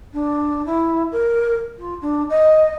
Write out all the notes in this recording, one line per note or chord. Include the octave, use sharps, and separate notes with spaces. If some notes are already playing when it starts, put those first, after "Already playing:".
D4
E4
A#4
F4
D4
D#5